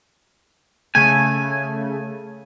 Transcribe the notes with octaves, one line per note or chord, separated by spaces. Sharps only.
C#3 A3 G#5